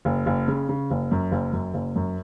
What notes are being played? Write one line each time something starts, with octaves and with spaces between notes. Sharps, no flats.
F#1
F#1
C#3
C#3
F#1
F#2
F#1
F#2
F#1
F#2